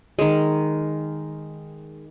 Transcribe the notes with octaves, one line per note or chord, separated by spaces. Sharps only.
D#3 G#3